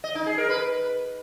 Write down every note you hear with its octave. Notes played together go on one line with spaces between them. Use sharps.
D#5
D#4
G#4
A#4
B4